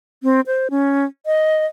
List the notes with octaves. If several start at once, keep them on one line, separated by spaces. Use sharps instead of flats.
C4
C5
C#4
D#5